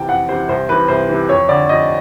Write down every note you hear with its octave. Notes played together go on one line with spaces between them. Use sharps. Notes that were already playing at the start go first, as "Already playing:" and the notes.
Already playing: C3 E3 G5 A5
F2 F#5
C3 E3 C5
C2 C5
C3 E3 B4
C2 C5
C3 E3
F2 C#5
D3 D5
F2 D#5